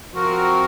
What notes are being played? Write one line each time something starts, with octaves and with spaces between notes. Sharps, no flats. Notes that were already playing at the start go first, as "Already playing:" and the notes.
F3 C4 F#4 A#4